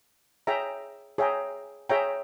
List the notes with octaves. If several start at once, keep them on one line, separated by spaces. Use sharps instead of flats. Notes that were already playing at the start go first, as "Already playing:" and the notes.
G#4 C#5 E5 G5 A#5
G#4 C#5 E5 G5 A#5
G#4 C#5 E5 G5 A#5